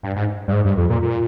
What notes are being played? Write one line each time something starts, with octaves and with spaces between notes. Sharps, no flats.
G2
G#2
G2
G#2
G2
F2
A#2
A#2